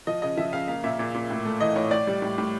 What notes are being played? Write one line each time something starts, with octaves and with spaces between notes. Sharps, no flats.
F3 D#5
C#3 D#5
F3 E5
C#3 F5
A#3 F5
A#2 E5
A#2
A#2
A2
A3
E3 D#5
A2 C#5
A2 D5
G3
A2
A2